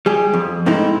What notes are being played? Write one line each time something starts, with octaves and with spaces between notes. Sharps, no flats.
G3 G#4
F2
G#2 C3 A3 D#4 E4